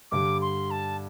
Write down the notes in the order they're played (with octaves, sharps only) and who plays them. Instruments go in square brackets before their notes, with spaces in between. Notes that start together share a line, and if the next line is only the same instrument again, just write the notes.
[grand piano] G2 D3 G3 [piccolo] D6
[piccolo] C6
A5